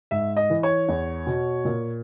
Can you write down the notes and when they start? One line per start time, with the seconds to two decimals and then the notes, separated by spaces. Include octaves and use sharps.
0.11 G#2 E5
0.37 D#5
0.50 E3
0.63 C#5
0.89 E2
1.27 B2
1.65 A#2